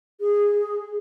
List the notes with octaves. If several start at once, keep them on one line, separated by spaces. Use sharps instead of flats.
G#4